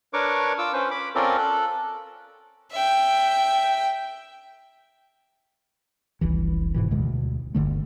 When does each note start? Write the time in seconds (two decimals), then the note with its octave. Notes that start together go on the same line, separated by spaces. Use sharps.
0.13 D4 A#4 B4 C#5 C#6 D6
0.58 F4 D6 E6
0.73 C#4 B4 C5
0.91 B5 D6
1.15 C4 C#4 F4 A4 A#4 D5
1.38 A4 F#6
2.72 E5 G5
6.21 F1 C2 E3
6.74 G#2 B2 E3
6.91 D2 B2 G#3
7.55 G1 F2 D3 A3